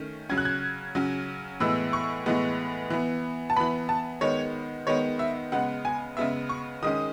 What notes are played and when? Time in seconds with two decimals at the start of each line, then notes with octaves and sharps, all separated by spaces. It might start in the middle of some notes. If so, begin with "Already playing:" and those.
Already playing: D#3 A3 C#4
0.30 C#3 F#3 C#4 G#6
0.38 F#6
0.45 G#6
0.95 C#3 F#3 C#4
1.60 A2 E3 G#3 B3 E6
1.93 C#6
2.26 A2 E3 G#3 B3
2.90 E3 B3
3.50 A5
3.56 E3 B3 B5
3.89 A5
4.21 D#3 G#3 B3 C#5
4.87 D#3 G#3 B3 C#5
5.19 E5
5.52 C#3 G#3 B3 F#5
5.85 G#5
6.17 C#3 G#3 B3 E5
6.49 C#6
6.83 D#3 G#3 C#4 D#6